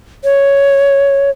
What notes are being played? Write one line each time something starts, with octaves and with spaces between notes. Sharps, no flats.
C#5